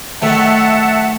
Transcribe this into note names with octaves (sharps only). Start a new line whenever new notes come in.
D#3 F#3 A3 E5 F#5 A5